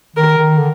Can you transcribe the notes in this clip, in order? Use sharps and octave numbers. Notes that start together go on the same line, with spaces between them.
D#3 A#4
D#3
D3